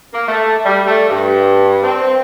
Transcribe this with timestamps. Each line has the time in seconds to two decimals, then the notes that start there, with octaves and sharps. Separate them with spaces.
0.14 A#3
0.28 A3
0.66 G3
0.87 A3
1.10 G2
1.83 C4